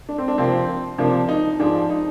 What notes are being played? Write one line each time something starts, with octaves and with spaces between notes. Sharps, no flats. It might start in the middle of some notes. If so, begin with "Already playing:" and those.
D4
C4
D4
C3 F3 A#3 C4
C3 F3 A#3 D4
D#4
G#2 F3 G#3 D4
D#4